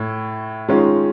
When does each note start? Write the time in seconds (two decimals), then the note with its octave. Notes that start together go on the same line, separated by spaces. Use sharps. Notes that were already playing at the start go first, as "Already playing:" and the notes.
Already playing: A2 A3
0.68 D#3 G#3 C#4 F4